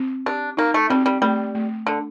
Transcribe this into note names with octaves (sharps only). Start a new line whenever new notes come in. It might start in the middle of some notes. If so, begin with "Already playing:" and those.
Already playing: C4
D4 G4
A#3 D#4
A3
G3 C4
G3
G3 A3
A3
D3 D4